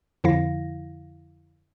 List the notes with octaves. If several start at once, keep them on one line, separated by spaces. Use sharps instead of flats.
F2 D3 F3 E4 F5 A#6